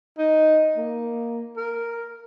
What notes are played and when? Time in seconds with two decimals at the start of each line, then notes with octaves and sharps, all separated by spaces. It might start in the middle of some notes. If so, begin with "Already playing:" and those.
0.18 D#4
0.77 A#3
1.57 A#4